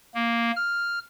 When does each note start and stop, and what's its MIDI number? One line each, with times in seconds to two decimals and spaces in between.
0.15 0.52 58
0.56 0.99 89